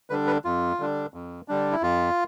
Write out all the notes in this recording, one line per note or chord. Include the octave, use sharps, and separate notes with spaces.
D3 G3 D4 B4
B4
F2 F4
D3 G3 D4
F2
D3 G3 D4
E4
F2 F4